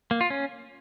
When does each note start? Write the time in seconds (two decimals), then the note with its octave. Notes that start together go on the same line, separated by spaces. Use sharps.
0.11 A#3
0.21 F4
0.30 C#4